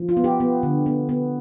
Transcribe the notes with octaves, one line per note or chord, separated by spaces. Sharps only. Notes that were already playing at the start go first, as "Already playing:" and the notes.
Already playing: F3
F4
B3
G4
B3
D3
B3
B3